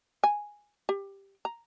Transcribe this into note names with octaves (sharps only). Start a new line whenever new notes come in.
G#5
G4
A#5